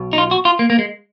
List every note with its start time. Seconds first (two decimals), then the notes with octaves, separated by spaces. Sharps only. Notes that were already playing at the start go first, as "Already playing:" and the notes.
Already playing: B1 B2
0.13 D#4
0.18 F4
0.31 F#4
0.45 F4
0.59 A#3
0.70 A#3
0.79 G#3